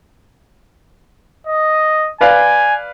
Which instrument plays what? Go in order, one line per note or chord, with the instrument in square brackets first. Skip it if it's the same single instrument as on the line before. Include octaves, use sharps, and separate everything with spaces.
[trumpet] D#5
[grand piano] B4 D5 F5 [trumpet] G#5